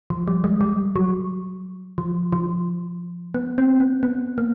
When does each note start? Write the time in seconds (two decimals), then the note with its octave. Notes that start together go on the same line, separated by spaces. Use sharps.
0.10 F3
0.28 G3
0.44 G#3
0.61 G3
0.96 F#3
1.98 F3
2.33 F3
3.34 B3
3.58 C4
3.80 B3
4.03 B3
4.38 A#3